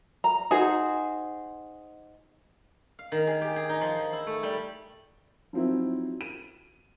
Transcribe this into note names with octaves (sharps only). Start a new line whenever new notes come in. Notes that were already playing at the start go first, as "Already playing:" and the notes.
A#5
D#4 F#4 G#4 C5
F5
D#3
G#4
G4
G#4
D#4
F3
F3
E4
A3
G3
F3 F#3 C4 D#4 E4
D#7